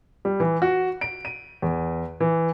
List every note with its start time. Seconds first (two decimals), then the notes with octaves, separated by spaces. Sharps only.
0.25 G3
0.40 E3
0.62 F#4
1.01 D7
1.25 D#7
1.62 E2
2.20 E3